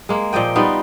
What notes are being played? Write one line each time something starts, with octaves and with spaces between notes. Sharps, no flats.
G#3 A#3
A#2 F3 D#5 G5
G3 B3 D#4 F4